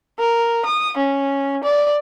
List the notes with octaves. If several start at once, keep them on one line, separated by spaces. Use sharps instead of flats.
A#4
D#6
C#4
D5